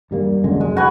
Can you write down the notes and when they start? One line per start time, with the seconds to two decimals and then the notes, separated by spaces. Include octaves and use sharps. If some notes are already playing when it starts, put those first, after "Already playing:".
0.11 G2 G3 A#3
0.44 F#2 D3 G#3
0.61 F1 G#3
0.77 F#4 B4 G#5